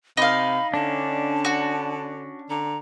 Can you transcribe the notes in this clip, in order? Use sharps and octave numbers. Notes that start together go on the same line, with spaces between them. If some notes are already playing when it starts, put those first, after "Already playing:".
C3 D#4 F5 B5
D3 C#4 D4 A5
F#4
D3 A#5